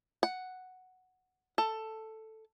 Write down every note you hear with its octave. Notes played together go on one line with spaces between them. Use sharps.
F#5
A4